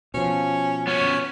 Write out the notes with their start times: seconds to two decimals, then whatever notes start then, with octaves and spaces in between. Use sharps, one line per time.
0.14 B2 F3 C#4
0.87 B3 C#4 C#5